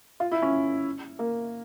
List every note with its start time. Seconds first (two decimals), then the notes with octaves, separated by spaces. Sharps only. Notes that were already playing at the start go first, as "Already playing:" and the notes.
0.20 F4
0.31 E4
0.42 C#4
1.19 A#3